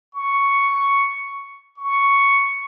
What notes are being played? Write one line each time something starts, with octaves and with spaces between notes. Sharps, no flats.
C#6
C#6